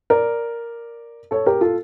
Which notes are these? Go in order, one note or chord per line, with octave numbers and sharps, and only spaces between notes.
A#4 D5
A4 C#5
G4 A#4
F4 A4